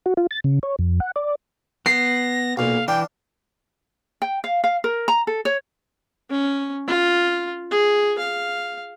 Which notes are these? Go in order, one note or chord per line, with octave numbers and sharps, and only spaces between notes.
F#4
F4
A6
C#3
C#5
F2
F#5
D5
B3 A#6 C7
B1 A#2 F5
E3 D4 F5 G5
G5
F5
F5
A#4
A#5
A4
C#5
C#4
F4
G#4
F5